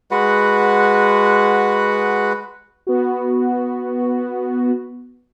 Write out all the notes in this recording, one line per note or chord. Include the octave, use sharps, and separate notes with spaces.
G#3 F#4 B4 F#5
B3 F#4